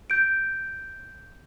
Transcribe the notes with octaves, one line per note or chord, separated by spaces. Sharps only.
G6 D7